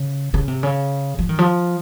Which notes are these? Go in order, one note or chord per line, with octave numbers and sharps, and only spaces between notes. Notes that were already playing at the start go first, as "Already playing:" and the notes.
Already playing: C#3
C#3
C3
C#3
F3
D#3
F3